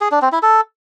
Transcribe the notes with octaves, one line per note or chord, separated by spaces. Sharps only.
G#4
D4
C4
E4
A4